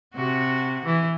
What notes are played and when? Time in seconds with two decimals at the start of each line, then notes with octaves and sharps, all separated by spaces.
0.15 C3 F#4
0.85 E3